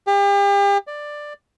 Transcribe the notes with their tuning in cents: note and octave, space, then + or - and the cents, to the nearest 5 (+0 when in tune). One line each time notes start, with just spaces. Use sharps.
G4 +40
D5 +10